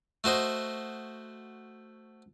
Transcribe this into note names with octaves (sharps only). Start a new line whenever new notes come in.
A3 F#4 C5 D#5